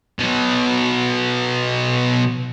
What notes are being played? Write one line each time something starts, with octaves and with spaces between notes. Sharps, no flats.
B2 F#3